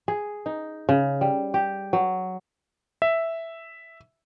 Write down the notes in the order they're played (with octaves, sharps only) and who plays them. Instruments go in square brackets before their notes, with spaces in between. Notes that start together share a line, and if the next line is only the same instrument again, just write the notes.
[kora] G#4
D#4
C#3
G3
G4
F#3
[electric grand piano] E5